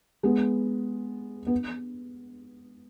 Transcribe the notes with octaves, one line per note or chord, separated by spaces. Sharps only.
G#3 B3
B3